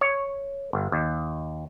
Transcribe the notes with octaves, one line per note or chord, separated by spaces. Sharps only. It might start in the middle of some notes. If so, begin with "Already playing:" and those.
C#5
G1
D#2